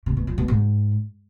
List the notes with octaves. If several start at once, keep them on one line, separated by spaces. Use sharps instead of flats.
C3
B2
F3
B2
G#2